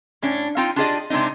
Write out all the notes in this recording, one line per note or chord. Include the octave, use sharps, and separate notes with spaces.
A2 C#4 D4
C4 D#4 F4 G5
D4 F4 G4 G#4 D5 D#5
C3 G#3 C4 D4 D#4